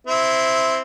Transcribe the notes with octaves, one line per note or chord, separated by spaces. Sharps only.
C4 E4